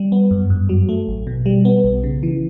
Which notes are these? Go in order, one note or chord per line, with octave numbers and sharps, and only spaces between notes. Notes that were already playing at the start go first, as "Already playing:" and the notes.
Already playing: G3
B3
F#2
G2
F#3
A3
A1
B2
G3
B3
B1
C#3
E3